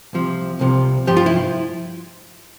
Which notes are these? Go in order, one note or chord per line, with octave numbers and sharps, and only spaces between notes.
C2 C3 F3
C2 C3 F3
G2 F3 G4
F4
E4